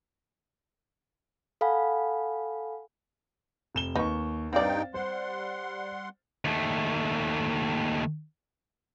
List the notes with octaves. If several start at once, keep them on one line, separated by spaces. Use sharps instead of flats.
A4 F5 F#5 G#5 B5
F1 E7 G7
D#2 D#4 B4 C#6
G2 C4 D#4 D5 F5 G5 A6
G3 C5 F#5 C6
D#2 A3